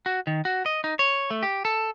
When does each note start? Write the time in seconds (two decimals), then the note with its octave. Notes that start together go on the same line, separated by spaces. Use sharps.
0.06 F#4
0.27 D#3
0.45 F#4
0.66 D#5
0.84 D#4
0.99 C#5
1.31 A3
1.43 G4
1.65 A4